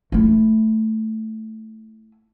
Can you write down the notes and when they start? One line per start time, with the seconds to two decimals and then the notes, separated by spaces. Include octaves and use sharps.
0.12 A3 E4